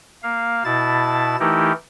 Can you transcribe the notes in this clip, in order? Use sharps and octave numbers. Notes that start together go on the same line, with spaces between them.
A#3 F5
B2 E4 A5 A6
E3 A3 D#4 E4 G4 A#4